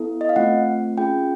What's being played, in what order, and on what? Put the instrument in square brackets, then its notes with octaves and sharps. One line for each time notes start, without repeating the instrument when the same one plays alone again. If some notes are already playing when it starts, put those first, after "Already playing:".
Already playing: [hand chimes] B3 E4 A4
D#5
F5
A3 C4 F4 F#5
C#4 F4 G#4 G5